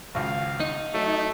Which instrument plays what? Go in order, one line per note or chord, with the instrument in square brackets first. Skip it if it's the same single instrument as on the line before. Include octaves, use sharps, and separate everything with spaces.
[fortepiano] G#1 C#2 [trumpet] F5
[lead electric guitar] D#4
[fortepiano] F#3 [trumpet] A3